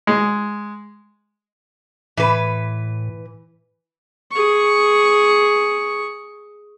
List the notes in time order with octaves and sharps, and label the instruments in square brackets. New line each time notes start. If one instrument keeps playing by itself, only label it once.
[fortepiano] G#3
[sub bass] A2 [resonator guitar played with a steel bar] E3 B4
[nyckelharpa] G#4 C#6